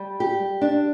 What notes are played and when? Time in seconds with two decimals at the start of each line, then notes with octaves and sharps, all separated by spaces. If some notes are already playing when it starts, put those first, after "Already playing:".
Already playing: G3
0.20 G4
0.61 D4